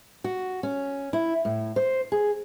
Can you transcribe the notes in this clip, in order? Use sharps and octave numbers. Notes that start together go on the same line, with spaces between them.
F#4
C#4
E4
A2
C5
G#4